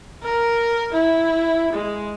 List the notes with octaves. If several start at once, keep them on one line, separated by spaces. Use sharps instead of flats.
A#4
E4
G#3